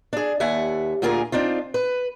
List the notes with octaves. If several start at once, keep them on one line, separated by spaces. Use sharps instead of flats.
D4 G#4
D#2 E5 F#5 G#5
D2 A#2 F4 G#4 A#4 G#5
C4 D4 D#4 F4
B4